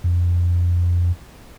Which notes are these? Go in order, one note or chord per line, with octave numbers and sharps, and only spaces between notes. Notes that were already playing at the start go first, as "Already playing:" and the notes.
F2